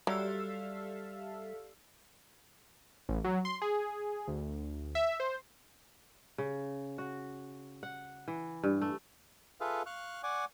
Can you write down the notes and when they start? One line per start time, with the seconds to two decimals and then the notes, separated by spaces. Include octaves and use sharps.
0.07 F#3 G3 G4 A4 D5 E5 F5 E6
3.09 A1
3.24 F#3
3.45 C6
3.62 G#4
4.28 D2
4.95 E5
5.20 C5
6.38 C#3
6.98 F#4
7.83 F#5
8.28 E3
8.63 G2
8.81 A3
9.61 F4 G#4 A4 B4 E5 F5
9.86 F5 C#6 F6 F#6
10.23 D5 F#5 G#5 C#6 D6